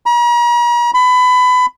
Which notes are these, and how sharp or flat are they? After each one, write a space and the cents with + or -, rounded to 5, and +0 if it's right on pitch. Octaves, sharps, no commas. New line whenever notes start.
A#5 +45
B5 +25